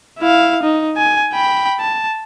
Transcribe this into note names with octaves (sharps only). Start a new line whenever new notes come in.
E4 F5
D#4
G#5
G5 B5
A5